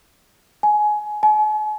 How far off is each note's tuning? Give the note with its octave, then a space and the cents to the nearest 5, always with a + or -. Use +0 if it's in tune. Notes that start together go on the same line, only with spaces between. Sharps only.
G#5 +20
G#5 +45